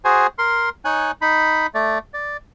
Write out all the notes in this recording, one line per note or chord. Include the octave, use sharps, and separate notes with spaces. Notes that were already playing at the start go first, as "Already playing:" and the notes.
F#4 G#4 C5 G#5
A#4 C6
D#4 C#5 G#5 F#6
D#4 B5
A3 D5
D5